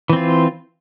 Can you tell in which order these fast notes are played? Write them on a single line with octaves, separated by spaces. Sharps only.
E3 C4 F4